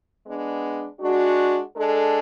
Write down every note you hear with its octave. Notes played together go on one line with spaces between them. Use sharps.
G#3 B3 D4
G#3 D4 F#4
G#3 D4 A4